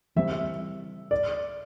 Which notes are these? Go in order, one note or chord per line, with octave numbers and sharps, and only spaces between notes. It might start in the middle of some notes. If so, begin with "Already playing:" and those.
E3 G3 C4 E5
E5
D5